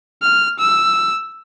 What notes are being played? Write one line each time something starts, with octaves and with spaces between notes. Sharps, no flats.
F6
E6